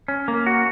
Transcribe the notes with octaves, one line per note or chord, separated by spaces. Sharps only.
C#4
A#3
F#4